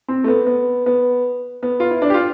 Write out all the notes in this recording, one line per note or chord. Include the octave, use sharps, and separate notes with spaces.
C4
A3
B3
B3
B3
B3
F4
E4
D4
G4
F4